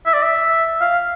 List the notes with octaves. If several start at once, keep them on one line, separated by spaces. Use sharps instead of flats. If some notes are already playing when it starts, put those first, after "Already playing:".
E5
D5
E5
F5